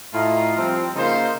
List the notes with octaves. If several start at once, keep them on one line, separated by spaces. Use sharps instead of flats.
A2 E4 F4 D#5 A#5
F3 G3 C4
C#3 A#3 D#4 F4 C5